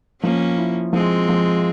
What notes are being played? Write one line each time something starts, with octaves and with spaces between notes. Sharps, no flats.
F3 A#3 C#4
E4
F3 G#3 C4
F3